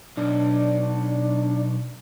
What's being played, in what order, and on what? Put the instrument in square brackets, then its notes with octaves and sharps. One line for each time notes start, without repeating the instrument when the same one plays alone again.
[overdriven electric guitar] B1 [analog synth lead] D4